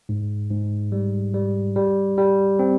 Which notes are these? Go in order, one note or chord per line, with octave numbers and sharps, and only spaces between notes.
G#2
G#2
G3
G3
G3
G3
C4